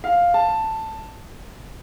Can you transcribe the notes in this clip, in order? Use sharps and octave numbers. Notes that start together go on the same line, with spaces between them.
F5
A5